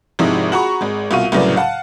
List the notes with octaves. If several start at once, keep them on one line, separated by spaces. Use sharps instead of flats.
G#1 C3 F3 G#3 D#4 E4
F#4 G#4 F#5 A#5 B5 C#6
G#1 G#3
C2 B2 F4 C#6 D#7
C2 A2 C#3 F#3 B4 D5
F5 F#5 A5